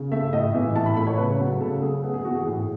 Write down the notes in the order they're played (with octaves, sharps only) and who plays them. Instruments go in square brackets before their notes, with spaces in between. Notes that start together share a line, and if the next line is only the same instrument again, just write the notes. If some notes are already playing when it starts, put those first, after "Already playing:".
Already playing: [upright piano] C#3
A3 E5
A2 D#5
E3 E5
A2 A5
B5
A3 B5
C#5
C#3 B4
F#3
C#3 A4
A3 G#4
B3 G#4
G#4
E3 F#4
G#4
A2